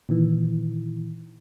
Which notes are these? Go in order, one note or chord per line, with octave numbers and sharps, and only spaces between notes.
A#2 D#3 E3